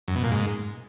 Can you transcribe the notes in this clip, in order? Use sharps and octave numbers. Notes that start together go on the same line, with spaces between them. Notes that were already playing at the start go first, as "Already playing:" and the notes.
F#2
B2
A#2
G#2